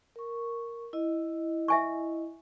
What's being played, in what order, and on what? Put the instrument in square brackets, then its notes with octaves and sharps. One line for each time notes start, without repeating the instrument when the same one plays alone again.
[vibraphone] A#4 C#6
E4 D#5
[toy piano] E5 G#5 C#6